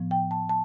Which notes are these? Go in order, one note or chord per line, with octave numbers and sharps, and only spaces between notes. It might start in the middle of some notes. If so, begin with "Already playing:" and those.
Already playing: A2 F3 B3
G5
A5
A5